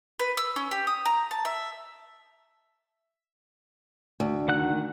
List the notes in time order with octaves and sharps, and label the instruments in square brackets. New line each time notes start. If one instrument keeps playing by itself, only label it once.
[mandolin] B4
E6
C#4
G4
D#6
A#5
A5
E5
[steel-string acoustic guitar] D2
[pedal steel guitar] D#3 F#5 F#6